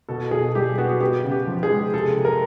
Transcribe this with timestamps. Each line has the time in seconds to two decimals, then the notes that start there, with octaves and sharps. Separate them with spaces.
0.09 B2 A4
0.31 B2 G#4
0.55 G3 G4
0.78 B3 F#4
1.00 B3 G4
1.24 C#3
1.31 G4
1.47 F3
1.63 G#4
1.70 G#3
1.94 C3 A4
2.17 C3
2.25 A#4